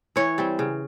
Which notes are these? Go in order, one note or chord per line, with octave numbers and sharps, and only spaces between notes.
E3 C#5
G3 C4
C#3